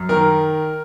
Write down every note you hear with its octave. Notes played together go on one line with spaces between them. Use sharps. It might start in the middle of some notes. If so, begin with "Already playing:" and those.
Already playing: F#2
D#3 A#4